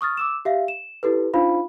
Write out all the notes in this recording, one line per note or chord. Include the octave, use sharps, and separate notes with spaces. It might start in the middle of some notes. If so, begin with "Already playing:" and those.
C#6 D#6 F6 A6
D6 E6 E7
G4 E5 F5
E7
E4 G4 A4 B4
D4 D#4 F4 C5 F5 B5